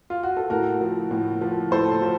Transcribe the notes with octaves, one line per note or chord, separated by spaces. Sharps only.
F4
F#4
A4
A2 F#4 A#4
F3
A2
F3
A2 A4 C5
F3